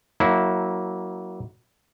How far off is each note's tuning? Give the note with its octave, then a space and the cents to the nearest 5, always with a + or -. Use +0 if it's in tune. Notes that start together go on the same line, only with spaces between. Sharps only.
F#3 +0 A#3 +0 E4 -25